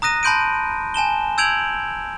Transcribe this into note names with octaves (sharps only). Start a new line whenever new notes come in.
A#5 D#6 F#6 A#6 D#7
A5 B5 C6 G6 D7 D#7
G#5 A5 E7 G7
E6 G6 G#6 D7 F7 F#7